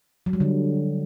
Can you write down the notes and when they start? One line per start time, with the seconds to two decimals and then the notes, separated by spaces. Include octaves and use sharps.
0.26 F#3
0.33 G3
0.40 D3